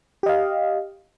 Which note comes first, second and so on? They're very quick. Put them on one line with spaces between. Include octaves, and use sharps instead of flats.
G4 D#5 F5